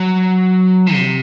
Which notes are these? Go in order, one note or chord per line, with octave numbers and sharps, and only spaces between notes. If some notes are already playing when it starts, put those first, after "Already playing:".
Already playing: F#3
C3